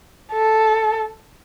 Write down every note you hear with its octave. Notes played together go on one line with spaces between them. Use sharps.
A4